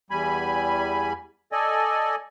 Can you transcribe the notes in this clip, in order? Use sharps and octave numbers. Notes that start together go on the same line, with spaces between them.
E2 G3 G#5 B5
A4 D5 D#5 G#5